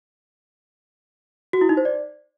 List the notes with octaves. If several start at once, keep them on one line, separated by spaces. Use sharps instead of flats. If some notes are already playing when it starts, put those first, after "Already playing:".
F#4
E4
D#4
C5
D5